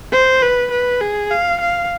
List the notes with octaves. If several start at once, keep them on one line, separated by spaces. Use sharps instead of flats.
C5
B4
B4
G#4
F5
F5